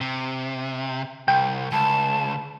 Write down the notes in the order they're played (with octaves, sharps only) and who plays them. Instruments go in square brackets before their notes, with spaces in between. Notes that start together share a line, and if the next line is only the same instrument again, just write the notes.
[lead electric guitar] C3
[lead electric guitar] C2 [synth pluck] G5
[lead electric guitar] C#2 [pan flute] A5